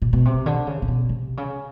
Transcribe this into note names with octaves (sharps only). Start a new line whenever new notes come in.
A#2
B2
C3
D3
C#3
C3
B2
C3
C#3